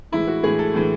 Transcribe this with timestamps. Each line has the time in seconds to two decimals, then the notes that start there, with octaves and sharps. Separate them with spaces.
0.12 A2 E3 G#3 E4
0.27 F#4
0.43 A2 E3 G#3 G#4
0.59 A4
0.74 A2 E3 G#3